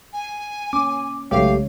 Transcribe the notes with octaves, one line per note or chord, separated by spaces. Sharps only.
G#5
A#3 C#4 D6
B1 C#3 G#3 A3 G4 C#5 F5